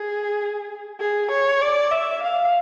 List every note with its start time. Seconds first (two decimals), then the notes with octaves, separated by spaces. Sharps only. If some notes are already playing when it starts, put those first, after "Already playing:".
Already playing: G#4
1.00 G#4
1.31 C#5
1.61 D5
1.91 E5
2.22 F5